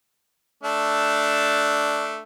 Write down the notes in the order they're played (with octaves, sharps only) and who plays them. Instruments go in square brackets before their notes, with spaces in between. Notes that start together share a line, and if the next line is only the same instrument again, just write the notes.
[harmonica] A3 D4